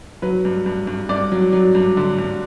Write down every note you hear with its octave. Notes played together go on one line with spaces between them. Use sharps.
F#3 B4
G2
G2
G2
G2 D5
F#3
F#3
G2
D3
G2